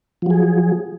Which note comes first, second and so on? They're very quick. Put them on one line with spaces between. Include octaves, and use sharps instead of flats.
F3 F#3 G#4